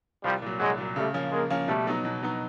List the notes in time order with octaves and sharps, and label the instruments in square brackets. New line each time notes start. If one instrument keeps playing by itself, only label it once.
[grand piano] C2 [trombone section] F3 G3
[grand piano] A#2 F#3
[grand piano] C2 [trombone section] F#3 G#3
[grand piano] A#2 F#3
[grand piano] C#3 [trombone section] G3 A3
[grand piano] F3 A#3 C#4
[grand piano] C#3 [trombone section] G#3 A#3
[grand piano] F3 A#3 C#4
[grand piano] B2 [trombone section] G3 A3
[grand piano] F#3 B3 D#4
B2
F#3 B3 D#4